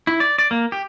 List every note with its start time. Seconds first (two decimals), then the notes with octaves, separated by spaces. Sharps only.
0.07 E4
0.20 D5
0.38 D5
0.51 A#3
0.72 G4